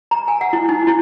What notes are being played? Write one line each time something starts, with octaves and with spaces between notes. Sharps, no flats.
A#5
G#5
F#5
E4
D#4
E4